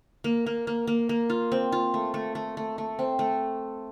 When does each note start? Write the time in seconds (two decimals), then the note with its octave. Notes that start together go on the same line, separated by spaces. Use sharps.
0.24 A#3
0.46 A#3
0.67 A#3
0.87 A#3
1.09 A#3
1.30 F4
1.52 C4
1.72 F4
1.94 A3
2.14 A3
2.35 A3
2.57 A3
2.78 A3
2.99 C4
3.19 A3